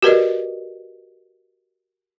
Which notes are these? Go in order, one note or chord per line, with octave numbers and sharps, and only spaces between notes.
F#4 G4 A#4 B4 D5 D#5